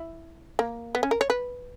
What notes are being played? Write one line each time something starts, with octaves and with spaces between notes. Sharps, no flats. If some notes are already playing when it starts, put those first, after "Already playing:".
Already playing: E4
A#3
B3
C#4
A#4
C#5
B4